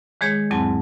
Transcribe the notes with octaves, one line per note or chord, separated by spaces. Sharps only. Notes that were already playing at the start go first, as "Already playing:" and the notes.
D#3 G#3 G#4 C#5
E2 G#2 F#3 C4 A5